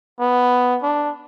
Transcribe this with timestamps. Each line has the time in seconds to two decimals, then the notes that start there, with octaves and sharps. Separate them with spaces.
0.20 B3
0.83 D4